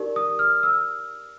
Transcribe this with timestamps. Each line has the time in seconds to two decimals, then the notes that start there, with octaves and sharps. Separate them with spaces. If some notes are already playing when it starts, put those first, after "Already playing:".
Already playing: D#4 G4 A#4 D5
0.16 D#6
0.39 F6
0.63 E6